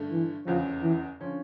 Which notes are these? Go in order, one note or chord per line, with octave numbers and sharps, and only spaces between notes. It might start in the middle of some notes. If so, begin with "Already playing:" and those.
Already playing: G2 D3 A3
E3
F1 E2 C#3 F3
E3
D3 F3 C#4